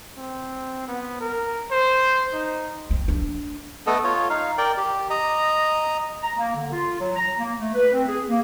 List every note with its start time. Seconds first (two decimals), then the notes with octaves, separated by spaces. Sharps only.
0.18 C4
0.88 B3
1.20 A#4
1.71 C5
2.33 D#4
2.91 C4
3.08 D4
3.87 A3 B3 A4 D#5
4.04 F4 C#5
4.30 D#4 F5
4.58 A#4 D5 G5
4.77 G4
5.10 D#5 A#5
6.23 A#5
6.38 A#3
6.56 D3
6.72 F4
7.00 F#3
7.17 A#5
7.39 A#3
7.59 A3
7.75 B4
7.93 C4
8.08 G#4
8.29 A#3